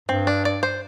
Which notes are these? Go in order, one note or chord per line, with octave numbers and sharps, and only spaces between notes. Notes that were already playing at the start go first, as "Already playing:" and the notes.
G2 C4
D4
D5
C5